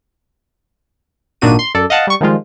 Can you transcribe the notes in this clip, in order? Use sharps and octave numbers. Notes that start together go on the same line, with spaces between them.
G#1 A#2 D4 D#4 F#4 D#7
C6
F#2 A4 D5
D#5 F5 F#5 A5
G3 C#6
D#3 F3 G3 G#3 F4